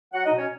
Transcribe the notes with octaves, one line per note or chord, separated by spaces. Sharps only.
F#3 F#4 F#5
D#4 D#5
B2
C#4 C#5